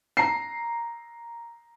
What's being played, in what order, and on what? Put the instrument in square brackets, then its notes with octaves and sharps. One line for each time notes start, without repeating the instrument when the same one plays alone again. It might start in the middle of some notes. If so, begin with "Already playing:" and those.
[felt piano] A#5 C7